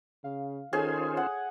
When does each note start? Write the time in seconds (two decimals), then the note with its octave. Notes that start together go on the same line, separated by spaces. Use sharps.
0.24 C#3 F5
0.73 D#3 C#4 F4 G#4 A4 C5 C#5
1.17 F#5